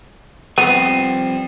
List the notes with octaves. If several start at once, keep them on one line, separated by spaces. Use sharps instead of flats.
F3 G3 B3 C4 D#7